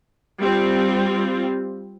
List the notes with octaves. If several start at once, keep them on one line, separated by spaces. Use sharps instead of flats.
G3 C4 F4